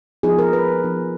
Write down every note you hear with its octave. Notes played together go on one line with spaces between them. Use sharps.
F3 B3 D#4 G#4
A#4
B4
F3 B3 D#4